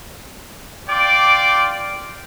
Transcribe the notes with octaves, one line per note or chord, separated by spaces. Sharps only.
F4 D5 G5 D6